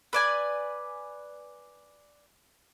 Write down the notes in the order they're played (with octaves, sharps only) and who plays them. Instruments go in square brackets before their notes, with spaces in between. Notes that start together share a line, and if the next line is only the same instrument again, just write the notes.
[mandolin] B4 D5 G#5